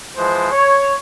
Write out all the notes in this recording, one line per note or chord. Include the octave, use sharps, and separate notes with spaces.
E3 F3 G#3 C5
C#5